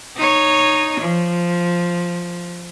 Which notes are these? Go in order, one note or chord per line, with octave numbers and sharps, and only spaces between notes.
D#4 C#5
F3